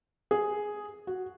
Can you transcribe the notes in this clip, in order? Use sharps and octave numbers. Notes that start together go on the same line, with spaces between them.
G#4
F#4